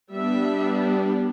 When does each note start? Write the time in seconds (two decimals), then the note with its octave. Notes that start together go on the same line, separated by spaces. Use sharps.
0.13 G3 B3 D4 E5